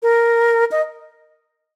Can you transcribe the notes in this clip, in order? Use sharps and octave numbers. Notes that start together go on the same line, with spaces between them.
A#4
D#5